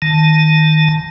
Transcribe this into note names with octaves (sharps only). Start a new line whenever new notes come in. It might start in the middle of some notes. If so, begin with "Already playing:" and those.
D#3 A5